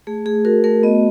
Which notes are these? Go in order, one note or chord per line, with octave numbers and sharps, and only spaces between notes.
A3 G#4
A3 G#4
F#4 A#4
A3 A#4
B3 D#5